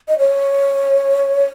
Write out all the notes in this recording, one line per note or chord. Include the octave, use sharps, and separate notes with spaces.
D#5
C#5